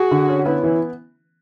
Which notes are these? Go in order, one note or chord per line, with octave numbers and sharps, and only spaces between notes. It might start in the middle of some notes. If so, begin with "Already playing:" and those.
Already playing: F#4 G#4
D3
C#4
B3 E4
E3